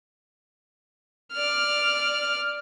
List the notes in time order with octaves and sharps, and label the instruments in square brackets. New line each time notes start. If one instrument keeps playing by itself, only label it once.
[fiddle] D5 F6